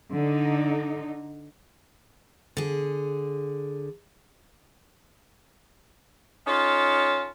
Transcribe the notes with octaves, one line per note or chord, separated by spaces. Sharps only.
D3 D#4
D3 G#4
C#4 D#4 F4 A4 C#5